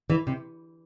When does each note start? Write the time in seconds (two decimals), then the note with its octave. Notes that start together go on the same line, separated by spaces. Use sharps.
0.10 E3
0.27 C3